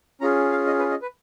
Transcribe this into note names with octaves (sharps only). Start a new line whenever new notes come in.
C#4 F4 G#4 A#5
F5
D#5
B4
D#5
B4